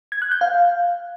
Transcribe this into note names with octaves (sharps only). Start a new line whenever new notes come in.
G#6
F#6
G6
F5